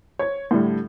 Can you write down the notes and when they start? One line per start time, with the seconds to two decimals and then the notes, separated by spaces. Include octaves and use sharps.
0.19 C#5 G#6
0.51 A2 D3 G3